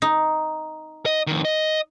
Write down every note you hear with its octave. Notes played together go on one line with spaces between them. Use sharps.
D#4
D#5
F2 D#3
D#5